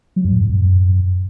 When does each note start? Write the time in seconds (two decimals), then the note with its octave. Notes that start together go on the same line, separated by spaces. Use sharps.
0.16 F#3
0.25 F#2
0.33 A2
0.41 G#2
0.49 F#2